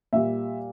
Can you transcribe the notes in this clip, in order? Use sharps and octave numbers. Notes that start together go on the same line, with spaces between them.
A#2 G3 E5